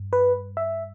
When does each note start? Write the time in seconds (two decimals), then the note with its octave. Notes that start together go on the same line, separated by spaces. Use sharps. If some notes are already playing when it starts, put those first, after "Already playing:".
Already playing: G2
0.13 B4
0.57 E5